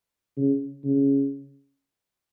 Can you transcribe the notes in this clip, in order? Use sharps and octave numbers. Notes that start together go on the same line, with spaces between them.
C#3
C#3